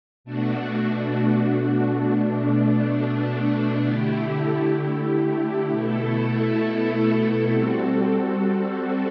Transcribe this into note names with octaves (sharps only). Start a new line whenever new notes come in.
B2 A3 D4 F#4
B2 A3 D4
D3 A3 E4 G4
B2 A3 E4 A4
G3 C4 F#4 A4